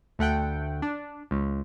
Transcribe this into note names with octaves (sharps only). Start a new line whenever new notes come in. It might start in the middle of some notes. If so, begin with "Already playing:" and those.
D2 A3 F#5 G5
D4
C#2